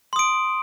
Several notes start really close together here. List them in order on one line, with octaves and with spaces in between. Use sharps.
C6 D#6 D7